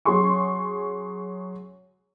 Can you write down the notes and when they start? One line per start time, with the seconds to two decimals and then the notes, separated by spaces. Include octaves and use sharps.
0.05 F#3 C#4 G#4 C6 C#6